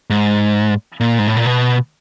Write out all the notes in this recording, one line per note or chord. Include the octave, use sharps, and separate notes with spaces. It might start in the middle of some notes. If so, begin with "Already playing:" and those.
G#2
A#2
G#2
A2
A#2
B2